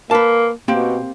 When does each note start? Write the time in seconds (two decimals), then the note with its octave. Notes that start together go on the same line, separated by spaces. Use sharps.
0.11 A#3 B4 A5
0.68 B2 A#3 C4 G4